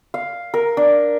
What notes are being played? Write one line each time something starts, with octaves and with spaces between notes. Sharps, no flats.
F5
A#4
D4